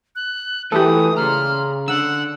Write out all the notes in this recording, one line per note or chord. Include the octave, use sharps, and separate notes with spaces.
F#6
E3 A3 F4 G4 A4 D#6
C#3 A#5 C6 F6
D3 F#5 E6